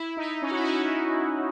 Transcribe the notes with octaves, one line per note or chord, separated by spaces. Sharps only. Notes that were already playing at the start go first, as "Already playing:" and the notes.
Already playing: E4
D#4
C#4
F#4
E4
D#4